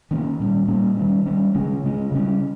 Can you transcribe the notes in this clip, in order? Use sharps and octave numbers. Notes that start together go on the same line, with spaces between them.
D#3 A#3 C#4
A#2 G3 A#3 C#4
A#2 G3 A#3 C#4
D#3 G3 C#4
D#3 G3 C#4
C#3 G#3 C#4
C#3 G#3 C#4
C#3 G3 C#4